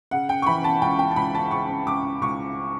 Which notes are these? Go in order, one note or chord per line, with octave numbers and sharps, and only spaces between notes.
C#3 F#5
G5
C#6
E3 B5
A5
C#2 G5
G5
A5
C#2 B5
A5
C#3 C#6
C#2 D6
C#2 C#6